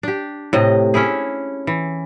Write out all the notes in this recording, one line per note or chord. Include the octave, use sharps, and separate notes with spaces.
D4 G4
A2 C3 D#5
C#4 D4 E4 G#4
E3